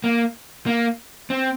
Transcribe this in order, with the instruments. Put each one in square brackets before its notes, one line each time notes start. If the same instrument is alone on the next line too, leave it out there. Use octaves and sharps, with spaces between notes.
[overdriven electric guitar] A#3
A#3
C4